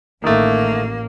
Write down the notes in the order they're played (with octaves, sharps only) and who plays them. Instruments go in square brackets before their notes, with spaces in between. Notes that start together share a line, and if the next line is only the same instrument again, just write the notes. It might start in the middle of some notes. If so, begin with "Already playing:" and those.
[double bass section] A1 [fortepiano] D#3 A3 [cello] A#3